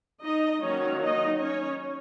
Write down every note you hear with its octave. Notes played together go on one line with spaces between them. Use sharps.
D#4 D#5
D#3 F#3 A#3 C#4 C#5
D#4 D#5
C#4 C#5